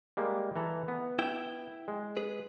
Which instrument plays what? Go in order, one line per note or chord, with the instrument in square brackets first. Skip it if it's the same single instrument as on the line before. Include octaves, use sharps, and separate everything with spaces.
[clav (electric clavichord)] G3 G#3 A#3
E3 A4 A#5
B3
[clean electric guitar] E4 E5 G5
[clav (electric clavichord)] G#3
[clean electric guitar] G#4 B4